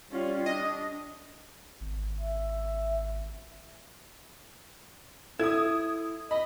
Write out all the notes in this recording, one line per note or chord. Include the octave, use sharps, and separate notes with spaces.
G3 C#4 F4
D4 D#5
G#1
E5
E4 A4 D#6 G#6
D#5 B5